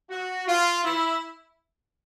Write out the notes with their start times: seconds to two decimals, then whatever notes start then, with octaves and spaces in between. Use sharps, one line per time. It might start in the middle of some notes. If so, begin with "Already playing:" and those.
0.11 F#4
0.48 F4
0.85 E4